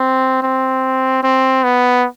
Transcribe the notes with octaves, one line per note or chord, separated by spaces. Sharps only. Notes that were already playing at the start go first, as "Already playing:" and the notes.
Already playing: C4
C4
C4
B3